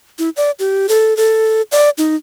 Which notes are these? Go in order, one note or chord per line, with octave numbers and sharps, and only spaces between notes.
E4
D5
G4
A4
A4
D5
D#4